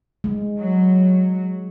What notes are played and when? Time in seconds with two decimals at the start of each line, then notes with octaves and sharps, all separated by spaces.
0.24 G#3
0.59 F#3